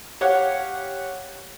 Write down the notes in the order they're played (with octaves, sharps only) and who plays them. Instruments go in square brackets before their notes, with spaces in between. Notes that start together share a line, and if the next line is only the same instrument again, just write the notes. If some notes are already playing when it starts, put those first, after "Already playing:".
[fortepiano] G4 C#5 F5 F#5